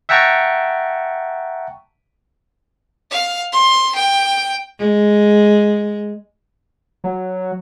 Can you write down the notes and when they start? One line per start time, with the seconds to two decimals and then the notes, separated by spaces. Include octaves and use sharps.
0.09 E5 F#5 G5 A5 A#5 C#6
3.11 F5
3.52 C6
3.96 G5
4.79 G#3
7.04 F#3